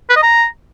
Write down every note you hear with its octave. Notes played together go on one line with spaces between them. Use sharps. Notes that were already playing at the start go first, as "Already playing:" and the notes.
B4
D#5
A#5